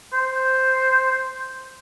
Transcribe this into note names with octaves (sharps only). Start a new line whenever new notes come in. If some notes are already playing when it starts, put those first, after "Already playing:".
C5